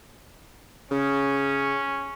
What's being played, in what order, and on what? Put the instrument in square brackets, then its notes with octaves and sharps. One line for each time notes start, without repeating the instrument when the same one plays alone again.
[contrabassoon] C#3 [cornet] C#4